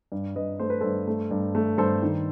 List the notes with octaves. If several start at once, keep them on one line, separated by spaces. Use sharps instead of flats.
G2
G2 B4 D#5
A3 C5
B4
G2 A4 C5
A3
G2
A3
G2 A4 C5
D#3